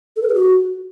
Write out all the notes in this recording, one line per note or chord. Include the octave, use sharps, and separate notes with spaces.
A4
B4
G#4
F#4